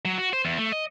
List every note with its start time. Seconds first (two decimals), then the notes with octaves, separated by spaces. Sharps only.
0.05 F#3
0.18 F#4
0.33 C5
0.45 E2
0.58 A3
0.72 D#5